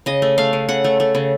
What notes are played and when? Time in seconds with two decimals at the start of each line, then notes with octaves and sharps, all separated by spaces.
0.06 C#3 D#5
0.22 A3
0.38 A3 F5
0.53 C#3
0.68 C#3 F#5
0.84 A3
1.00 A3
1.15 C#3